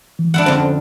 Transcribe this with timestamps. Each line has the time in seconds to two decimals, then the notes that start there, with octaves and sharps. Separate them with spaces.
0.19 E3
0.34 D4 E4 F#5
0.46 F2 D3 C5